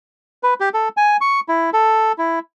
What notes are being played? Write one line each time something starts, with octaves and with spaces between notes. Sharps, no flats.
B4
G4
A4
G#5
C#6
E4
A4
E4